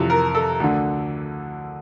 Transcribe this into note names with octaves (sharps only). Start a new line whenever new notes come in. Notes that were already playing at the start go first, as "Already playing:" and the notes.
Already playing: F2 C3 E3
A#4
A4
D2 D3